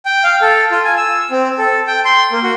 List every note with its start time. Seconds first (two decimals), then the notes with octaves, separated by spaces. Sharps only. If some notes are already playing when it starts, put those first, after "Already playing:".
0.05 G5
0.24 F5
0.42 A4
0.71 F4
0.84 G#5
0.97 E6
1.31 C4
1.58 A4
1.87 G5
2.05 C6
2.32 A#3
2.43 F#4